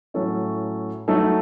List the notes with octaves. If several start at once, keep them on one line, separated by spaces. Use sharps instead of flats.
A2 F#3 C#4 E4 A4
F#3 A3 D#4 A4